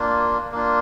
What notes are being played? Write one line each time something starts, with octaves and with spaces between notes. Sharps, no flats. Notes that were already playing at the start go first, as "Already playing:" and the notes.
Already playing: A#3 D4 F4
A#3 D4 F4